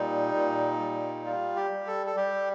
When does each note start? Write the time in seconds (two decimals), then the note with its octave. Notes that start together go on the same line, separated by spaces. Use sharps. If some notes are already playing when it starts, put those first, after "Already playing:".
Already playing: A#2 G3 D#4
0.34 A#2
0.79 G3
1.25 G3 F4
1.56 G4
1.71 G3
1.87 A4
2.07 A4
2.16 G3 G4